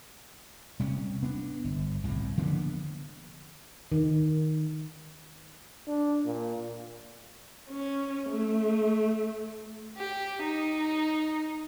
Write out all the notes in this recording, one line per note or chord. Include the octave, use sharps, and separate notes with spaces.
C3 G3 C#4
B3 D4
G1
C2 A2
D3 F3 A#3 B3
D#3
D4
A#2
C#4
A3
G4
D#4